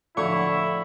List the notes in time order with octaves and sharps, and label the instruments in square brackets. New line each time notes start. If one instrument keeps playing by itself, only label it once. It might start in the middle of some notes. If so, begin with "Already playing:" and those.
[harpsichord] A2 F3 F#3 [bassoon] D3 [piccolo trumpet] E4 [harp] C#6